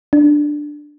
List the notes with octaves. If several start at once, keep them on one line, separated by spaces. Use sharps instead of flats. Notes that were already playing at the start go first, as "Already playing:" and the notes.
D4